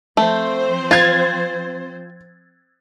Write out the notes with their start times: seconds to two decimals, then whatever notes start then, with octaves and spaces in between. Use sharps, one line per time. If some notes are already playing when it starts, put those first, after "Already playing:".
0.17 F3 A3 C4 C5
0.91 F4 G#6 A6